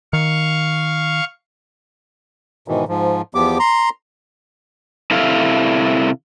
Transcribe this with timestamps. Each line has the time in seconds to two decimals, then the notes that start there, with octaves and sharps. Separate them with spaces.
0.13 D#3 F5 C#6
2.68 G#2 B2 D#3 E3
2.88 G#2 F3
3.35 E2 F3 B3 G4 D6
3.59 A#5 C6
5.11 C3 E4 A4 F5